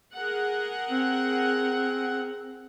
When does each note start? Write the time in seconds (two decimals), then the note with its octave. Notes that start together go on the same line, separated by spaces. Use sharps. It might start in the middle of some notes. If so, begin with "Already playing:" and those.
0.15 G#4 A#4 F#5
0.91 C4